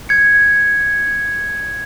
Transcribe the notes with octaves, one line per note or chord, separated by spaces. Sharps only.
G#6 C#7